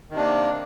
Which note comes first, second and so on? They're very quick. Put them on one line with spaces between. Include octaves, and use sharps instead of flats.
D#3 C3 D4 A#3